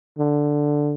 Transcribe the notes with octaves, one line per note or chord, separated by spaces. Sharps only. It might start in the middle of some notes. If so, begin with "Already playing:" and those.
D3